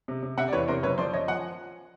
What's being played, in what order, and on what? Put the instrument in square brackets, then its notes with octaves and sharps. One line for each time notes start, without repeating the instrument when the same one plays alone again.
[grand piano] C3
C3
C3 E5 F#5
D5
E2 B4 C#5
C3 A#4 C5
F#1 B4 C#5
F3 C5 D5
F3 C#5 D#5
F3 F#5 G#5